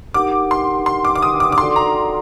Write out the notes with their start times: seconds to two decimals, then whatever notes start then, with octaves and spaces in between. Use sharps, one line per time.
0.14 D#4 G4 A#4 F#5 D6
0.51 C6
0.86 C6
1.05 D6
1.16 D6
1.22 D#6
1.40 D6
1.52 D6
1.58 D#4 F#4 A4 D5 F#5 C6
1.76 A#5